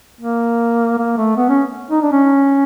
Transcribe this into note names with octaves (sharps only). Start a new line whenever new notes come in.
A#3
A#3
A3
B3
C#4
D#4
D4
C#4